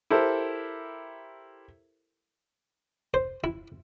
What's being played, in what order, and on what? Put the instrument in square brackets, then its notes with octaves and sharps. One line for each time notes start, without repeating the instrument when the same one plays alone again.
[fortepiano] E4 G4 A4 A#4 C5
[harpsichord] C5
E4